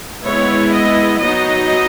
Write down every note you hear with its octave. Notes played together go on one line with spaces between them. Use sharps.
G#3 B3 E4 C#5
D#5
F#3 B3 D#4 D#5